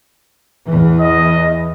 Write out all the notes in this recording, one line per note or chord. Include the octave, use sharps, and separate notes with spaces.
E2 E3
D#5